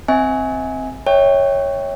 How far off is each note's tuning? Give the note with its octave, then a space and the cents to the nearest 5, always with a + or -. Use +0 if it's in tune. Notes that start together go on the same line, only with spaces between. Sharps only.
C4 +0 E5 -45 G#5 +0
C#5 +0 E5 -30 G5 +15